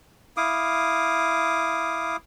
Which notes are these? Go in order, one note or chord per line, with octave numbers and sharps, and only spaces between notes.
E4 F5 D6 D#6